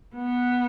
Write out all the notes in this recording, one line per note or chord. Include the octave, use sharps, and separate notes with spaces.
B3